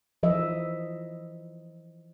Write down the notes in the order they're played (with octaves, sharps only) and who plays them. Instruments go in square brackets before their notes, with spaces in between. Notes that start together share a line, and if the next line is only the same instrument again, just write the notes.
[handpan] E3 F3 D#5 E5